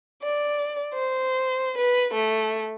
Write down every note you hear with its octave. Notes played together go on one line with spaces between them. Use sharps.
D5
C5
B4
A3